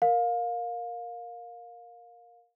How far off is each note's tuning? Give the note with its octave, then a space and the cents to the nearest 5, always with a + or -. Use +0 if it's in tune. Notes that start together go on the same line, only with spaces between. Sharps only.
A#4 +0 F5 +20